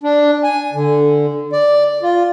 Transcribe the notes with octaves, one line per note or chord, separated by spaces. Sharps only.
D4
G#5
D3
D5
F4